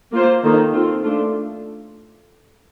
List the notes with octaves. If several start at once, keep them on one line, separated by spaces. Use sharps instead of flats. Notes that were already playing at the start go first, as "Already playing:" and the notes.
A#3 F4 C5
D#3 A#3 D#4 A4
C4 F4 A4
A3 D4 F4